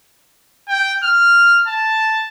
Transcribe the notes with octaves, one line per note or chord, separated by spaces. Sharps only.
G5
F6
A5